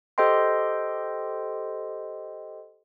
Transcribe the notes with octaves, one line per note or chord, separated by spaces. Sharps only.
G4 A4 C5 D#5 G5 C6